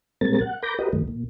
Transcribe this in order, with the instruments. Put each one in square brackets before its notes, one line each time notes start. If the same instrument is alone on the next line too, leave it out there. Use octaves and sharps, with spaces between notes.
[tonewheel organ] A#2 G3 G#3 C4 A#4 A6
F#5
A#4 B5 D6 G6 A#6
F#4 G4 A#4 B4 D#5
G2 D#3 A3
A#2